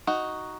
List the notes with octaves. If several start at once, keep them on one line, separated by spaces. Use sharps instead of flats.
D#4 F#4